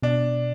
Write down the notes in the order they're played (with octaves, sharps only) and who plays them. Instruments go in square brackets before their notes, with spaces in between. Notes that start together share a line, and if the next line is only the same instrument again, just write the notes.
[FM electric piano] B2 [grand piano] D4